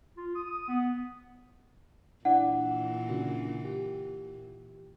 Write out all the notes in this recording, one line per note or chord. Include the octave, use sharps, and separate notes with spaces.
F4
D#6
D#6
B3
A#2 E3 D4 E4 D5 F#5
C#3 D4 F#4
G4